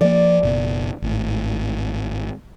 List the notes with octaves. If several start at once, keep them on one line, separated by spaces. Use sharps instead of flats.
F3 A#3 D5
F#1 B2
G#1 A2